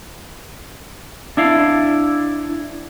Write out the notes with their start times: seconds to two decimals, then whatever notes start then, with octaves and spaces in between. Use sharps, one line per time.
1.37 D4 E4 F5